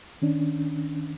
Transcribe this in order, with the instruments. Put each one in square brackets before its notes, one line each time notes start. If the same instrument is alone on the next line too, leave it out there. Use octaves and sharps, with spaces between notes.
[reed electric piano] D#3 C#4 D4